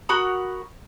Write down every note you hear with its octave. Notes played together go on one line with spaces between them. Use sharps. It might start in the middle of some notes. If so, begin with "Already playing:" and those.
F#4 A#4 B5 D#6